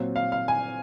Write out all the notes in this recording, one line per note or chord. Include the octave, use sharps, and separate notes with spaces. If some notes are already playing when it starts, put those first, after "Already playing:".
Already playing: A#2 F#3 C4
F5
F5
G#5